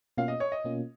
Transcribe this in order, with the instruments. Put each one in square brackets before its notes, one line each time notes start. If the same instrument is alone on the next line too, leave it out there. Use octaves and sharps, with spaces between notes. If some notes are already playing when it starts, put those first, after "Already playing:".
[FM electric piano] B2 A#3 C#4 F4 [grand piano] F5
[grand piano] D#5
C#5
D#5
[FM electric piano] B2 A#3 C#4 F4